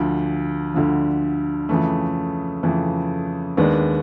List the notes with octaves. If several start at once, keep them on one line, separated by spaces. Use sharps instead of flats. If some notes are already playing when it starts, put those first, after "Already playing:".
Already playing: D2 D3 F3
D2 D3 F3
F2 C#3 E3 A3
F2 C#3 E3 A3
D#2 D#3 G#3 B3 D4